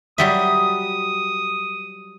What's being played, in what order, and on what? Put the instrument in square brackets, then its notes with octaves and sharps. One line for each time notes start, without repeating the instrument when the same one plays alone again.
[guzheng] F#3 G3 E5 [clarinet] D#6